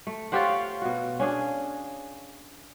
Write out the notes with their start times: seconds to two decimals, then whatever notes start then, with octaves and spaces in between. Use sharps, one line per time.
0.07 A3
0.32 F4 G4 C5 C#5 F5 F#5
0.82 B2 F#4
1.20 C#4 D4 G#4